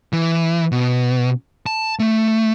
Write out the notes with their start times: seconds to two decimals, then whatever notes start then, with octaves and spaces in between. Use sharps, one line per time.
0.13 E3
0.72 B2
1.66 A5
2.00 A3